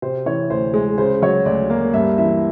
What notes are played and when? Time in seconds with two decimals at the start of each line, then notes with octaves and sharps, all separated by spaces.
0.02 C3 C5
0.26 E3 C#5
0.50 D2 C5
0.74 G#3
0.98 C#3 C5
1.22 F#3 C#5
1.45 D2 D5
1.70 A#3
1.94 G2 E5
2.18 E3 E5